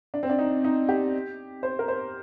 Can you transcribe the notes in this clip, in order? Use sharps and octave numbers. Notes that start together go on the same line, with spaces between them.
D4
C4
D4
D#4
D#4
G4
C5
A#4
C5